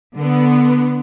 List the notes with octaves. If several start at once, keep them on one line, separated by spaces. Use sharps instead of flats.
D3 B3